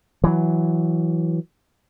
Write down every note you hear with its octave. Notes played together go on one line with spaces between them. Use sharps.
E3 F#3